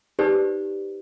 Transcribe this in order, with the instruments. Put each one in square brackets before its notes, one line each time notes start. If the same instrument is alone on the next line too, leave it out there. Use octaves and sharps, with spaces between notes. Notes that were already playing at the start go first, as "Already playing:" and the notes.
[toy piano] D#4 G4 B4 C5 D5